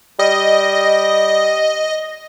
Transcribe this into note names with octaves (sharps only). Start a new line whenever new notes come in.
G3 D#5